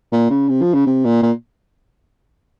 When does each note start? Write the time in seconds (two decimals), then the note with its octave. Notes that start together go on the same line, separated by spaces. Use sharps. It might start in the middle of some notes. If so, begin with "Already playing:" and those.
0.12 A#2
0.30 C#3
0.49 C3
0.62 F3
0.74 C#3
0.86 C3
1.05 A#2
1.23 A#2